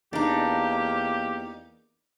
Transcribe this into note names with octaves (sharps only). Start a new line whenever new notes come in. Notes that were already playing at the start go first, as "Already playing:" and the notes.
E2 A#3 D4 D#4 G4